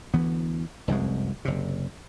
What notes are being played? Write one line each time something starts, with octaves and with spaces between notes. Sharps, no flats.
D2 E3 B3
F1 C2 F#2 G#3
F#1 C3